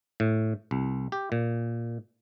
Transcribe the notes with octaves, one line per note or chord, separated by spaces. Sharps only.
A2
C2
G4
A#2